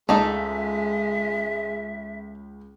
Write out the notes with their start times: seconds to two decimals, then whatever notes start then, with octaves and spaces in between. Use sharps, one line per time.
0.09 C#2 G#3 A3 D#4 A4 E5